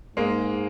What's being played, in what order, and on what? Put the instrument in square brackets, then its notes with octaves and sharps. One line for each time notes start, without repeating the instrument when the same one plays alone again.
[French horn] G#2 [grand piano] G#3 A#3